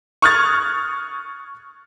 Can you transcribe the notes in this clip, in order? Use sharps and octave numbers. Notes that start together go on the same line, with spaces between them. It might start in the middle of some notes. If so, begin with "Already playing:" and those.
C#6 D#6 F6 F#6 G#6 A6